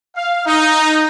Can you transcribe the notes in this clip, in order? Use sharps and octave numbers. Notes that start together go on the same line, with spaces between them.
F5
D#4